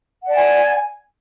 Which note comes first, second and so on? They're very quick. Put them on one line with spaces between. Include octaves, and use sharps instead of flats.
F#5 D5 A5 G#5